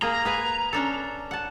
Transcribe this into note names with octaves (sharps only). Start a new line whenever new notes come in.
A#3 G#4 A#5
G#4 B4 G#5
C#4 D4 A4
F#5 A5